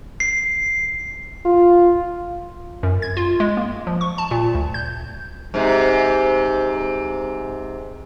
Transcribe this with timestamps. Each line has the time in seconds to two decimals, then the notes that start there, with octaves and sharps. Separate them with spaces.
0.20 C7
1.45 F4
2.83 F#2
3.02 G#6
3.17 F4
3.40 G#3
3.57 A#3
3.87 F3
4.01 C#6
4.18 A5
4.31 A#2
4.55 D2
4.74 G6
5.54 G#2 C3